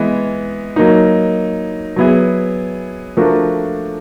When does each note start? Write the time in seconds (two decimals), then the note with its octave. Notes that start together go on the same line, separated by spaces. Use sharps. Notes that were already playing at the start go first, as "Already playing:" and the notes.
Already playing: E3 G#3 B3
0.76 F#3 A#3 D#4
1.96 F#3 B3 E4 G#4
3.17 F3 A3 D4 F#4 A#4